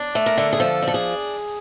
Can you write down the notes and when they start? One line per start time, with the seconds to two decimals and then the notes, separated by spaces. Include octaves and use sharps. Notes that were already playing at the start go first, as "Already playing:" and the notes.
Already playing: D4
0.15 A3
0.26 A#4
0.38 D3
0.53 G#4
0.60 F3 A4
0.82 D4
0.88 A4
0.94 G#4